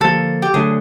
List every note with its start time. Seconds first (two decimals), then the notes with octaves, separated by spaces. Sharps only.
0.01 D3 F3 A#3 A4
0.42 G4
0.54 D3 F#3 A3 D4 G#4